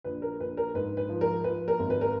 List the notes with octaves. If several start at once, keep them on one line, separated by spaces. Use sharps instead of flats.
A#1 B4
A#4
A#1 B4
A#4
G#2 B4
B4
F3
A#4
F3 B4
A#4
G#1
B4
A#4